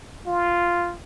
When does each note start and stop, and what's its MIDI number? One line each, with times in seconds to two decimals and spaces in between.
0.27 0.96 65